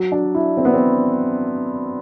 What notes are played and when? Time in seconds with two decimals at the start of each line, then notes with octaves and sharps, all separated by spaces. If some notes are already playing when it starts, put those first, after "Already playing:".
Already playing: F#3
0.12 D4
0.35 E4
0.57 C4
0.65 B3
0.74 C4